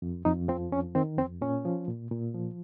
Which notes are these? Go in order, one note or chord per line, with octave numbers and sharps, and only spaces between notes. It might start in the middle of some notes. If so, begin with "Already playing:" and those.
F2
F2 D#4
F3 C4
F2 C#4
D#3 C4
F2 C4
A#2 C#4
F3
A#2
A#2
F3